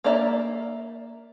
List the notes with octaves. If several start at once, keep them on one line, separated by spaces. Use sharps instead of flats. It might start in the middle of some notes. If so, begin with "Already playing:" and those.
A#3 A#4 D5 E5 A#5